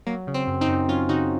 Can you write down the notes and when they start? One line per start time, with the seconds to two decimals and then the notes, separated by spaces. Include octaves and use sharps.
0.06 F#3 A#3
0.27 C#3
0.34 C4
0.47 F#2
0.61 C4 D#4
0.68 F#2
0.89 F#3 C#4 F4
1.09 C#3 D#4 F#4